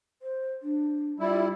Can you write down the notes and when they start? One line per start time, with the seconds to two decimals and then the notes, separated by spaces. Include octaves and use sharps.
0.22 C5
0.63 D4
1.20 G3 E4 F4